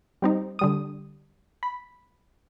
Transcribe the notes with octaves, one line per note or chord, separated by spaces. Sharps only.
G3 C4 D#4
D3 G3 D#6
B5